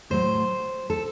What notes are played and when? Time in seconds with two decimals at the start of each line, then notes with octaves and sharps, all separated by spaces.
0.10 A2 F#3 A3 C5
0.90 A4